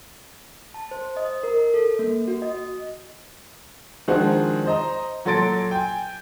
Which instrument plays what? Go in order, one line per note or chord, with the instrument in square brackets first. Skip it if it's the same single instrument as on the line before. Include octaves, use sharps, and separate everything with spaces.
[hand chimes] A5
C5
D#5
A#4
A4
A#3
F#4
D#5
[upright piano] D#3 F3 G#3 C4 D4 F#4
C5 D#5 A#5
A#2 F#3 A4 C6 A6 D7
G5 G#5